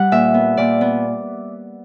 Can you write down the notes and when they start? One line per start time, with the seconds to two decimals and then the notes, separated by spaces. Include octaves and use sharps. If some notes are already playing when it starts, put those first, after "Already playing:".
Already playing: G3 F#5
0.12 A#2 E5
0.34 B3
0.57 A#2 D5
0.81 B3